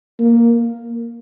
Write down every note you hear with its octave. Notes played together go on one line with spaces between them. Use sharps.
A#3